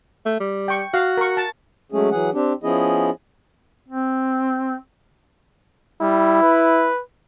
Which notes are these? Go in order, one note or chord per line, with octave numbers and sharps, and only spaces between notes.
A3
G3
G5 C#6
F#4 F5
A#4 C#6
A5
F#3 G#3 A3 C#4 G#4
E3 F#3 G#4 F#5
C4 D4 G4
F3 B3 C#4 E4 G#4 D#5
C4
G3 E4
B4